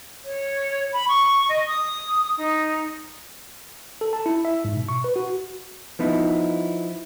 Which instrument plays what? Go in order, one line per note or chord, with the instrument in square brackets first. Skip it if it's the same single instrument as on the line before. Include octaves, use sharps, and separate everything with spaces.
[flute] C#5
B5
C#6
D#5
D#6
D#4
[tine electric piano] A4
A5
E4
E5
G#2
B2
C#6
B4
F#4
[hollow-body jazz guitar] F3 B3 D#4 E4